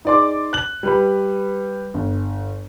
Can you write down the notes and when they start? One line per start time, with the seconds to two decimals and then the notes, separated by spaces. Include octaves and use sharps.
0.05 D#4 G#4 D5 C6 D6
0.53 F#6 F#7
0.83 G3 B4 B5
1.94 G1